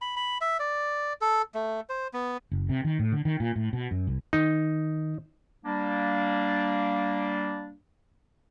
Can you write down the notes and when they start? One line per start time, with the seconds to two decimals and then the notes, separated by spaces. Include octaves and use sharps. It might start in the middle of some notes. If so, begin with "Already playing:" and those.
0.01 B5
0.16 B5
0.41 E5
0.59 D5
1.21 A4
1.55 A3
1.89 C5
2.14 B3
2.52 F#1
2.69 C3
2.84 D#3
2.99 A2
3.12 D3
3.25 D#3
3.40 A#2
3.56 A2
3.73 B2
3.91 F#2
4.07 C2
4.33 D#3 D#4
5.65 G3 A#3 D4